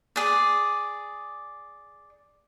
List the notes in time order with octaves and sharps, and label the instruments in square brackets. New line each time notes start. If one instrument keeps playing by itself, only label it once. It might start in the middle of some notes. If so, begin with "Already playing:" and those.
[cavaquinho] G#4 D5